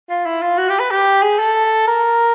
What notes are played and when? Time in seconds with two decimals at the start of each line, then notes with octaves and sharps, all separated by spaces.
0.10 F4
0.26 E4
0.42 F4
0.58 F#4
0.69 G4
0.79 B4
0.91 G4
1.23 G#4
1.39 A4
1.88 A#4